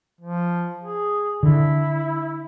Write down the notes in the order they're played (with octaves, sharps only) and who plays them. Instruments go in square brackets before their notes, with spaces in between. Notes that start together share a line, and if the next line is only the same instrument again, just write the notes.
[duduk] F3
G#4
[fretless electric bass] D3 [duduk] E4